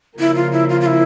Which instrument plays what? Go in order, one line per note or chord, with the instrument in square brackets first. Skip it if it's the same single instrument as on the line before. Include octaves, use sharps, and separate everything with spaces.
[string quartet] C#3 F3 A#3 [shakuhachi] E4
[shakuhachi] F4
E4
F4
F4
E4